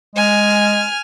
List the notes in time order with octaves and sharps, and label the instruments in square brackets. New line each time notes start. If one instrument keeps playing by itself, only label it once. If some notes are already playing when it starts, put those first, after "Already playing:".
[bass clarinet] G#3 [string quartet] G#5 F6